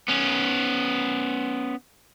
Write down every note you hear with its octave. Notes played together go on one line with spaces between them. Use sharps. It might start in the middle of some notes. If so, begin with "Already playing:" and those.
B3 C#4